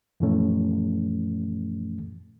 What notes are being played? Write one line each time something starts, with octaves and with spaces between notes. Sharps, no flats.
F#2 A#2 E3 F3 A3 C#4